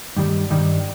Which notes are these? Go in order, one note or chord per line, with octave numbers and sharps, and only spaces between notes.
G2 D#3 G3
G2 D#3 G3